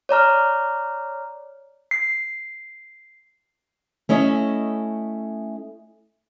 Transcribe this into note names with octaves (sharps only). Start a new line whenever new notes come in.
C#5 D5 A#5 F6
C7
A3 C#4 E4 D#5